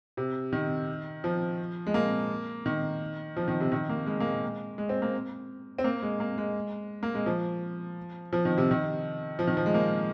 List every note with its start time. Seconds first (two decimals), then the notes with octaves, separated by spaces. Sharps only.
0.17 C3
0.53 D#3
1.24 F3
1.87 G#3
1.94 A#3
2.66 D#3
3.37 F3
3.48 D#3
3.60 C3
3.72 D#3
3.89 A#3
4.07 G#3
4.20 A#3
4.25 G#3
4.78 G#3
4.89 C4
5.02 A#3
5.78 C4
5.84 A#3
6.03 G#3
6.20 A#3
6.38 G#3
7.03 A#3
7.15 G#3
7.26 F3
8.33 F3
8.45 D#3
8.58 C3
8.71 D#3
9.39 F3
9.47 D#3
9.57 F3
9.66 G#3
9.74 A#3